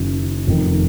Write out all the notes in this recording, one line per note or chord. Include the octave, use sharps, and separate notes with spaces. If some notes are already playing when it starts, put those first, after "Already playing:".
Already playing: F#1 F#2 D#3
F1 F2 D#3